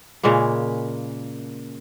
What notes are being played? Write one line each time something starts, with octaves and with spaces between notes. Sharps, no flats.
A#2 C#3 G#3 A#3